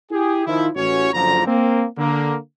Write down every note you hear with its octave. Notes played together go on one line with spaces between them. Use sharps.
E4 G4 G#4
D#3 F3 E4
A1 C#4 F#4 C#5
F#1 D3 F3 A#5
A#3 C4
D3 A#3